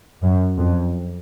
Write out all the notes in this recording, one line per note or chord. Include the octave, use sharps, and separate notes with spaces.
F#2
F2